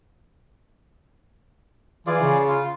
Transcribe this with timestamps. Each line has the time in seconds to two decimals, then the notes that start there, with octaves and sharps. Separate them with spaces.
2.07 E3 F4 G#4 D5
2.21 C#3
2.48 F4